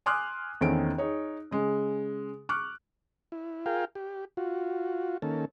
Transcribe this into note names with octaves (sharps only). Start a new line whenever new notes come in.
G#5 C6 D6 D#6 F6 F#6
E2 D#3 A3 C4 C#4 D7
D#4 G#4 C#5
C#3 G#3
C#6 D6 F6 F#6
E4
F4 G#4 A#4 F5 G5
G4
F4 F#4
D#3 A#3 C#4 A4